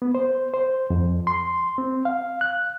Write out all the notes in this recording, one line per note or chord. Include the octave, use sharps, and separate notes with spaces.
B3
C5
C5
F2
C6
C4
F5
F#6